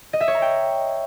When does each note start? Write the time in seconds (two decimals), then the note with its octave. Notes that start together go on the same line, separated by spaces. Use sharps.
0.13 D#5
0.20 E5
0.28 C#5
0.35 A#5
0.42 G5